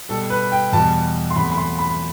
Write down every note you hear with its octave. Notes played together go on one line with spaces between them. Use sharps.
B2 G3 A4
B4
G5
E2 B2 G3 A5
C6
E2 C3 F#3 A3 B5
B5
C6
B5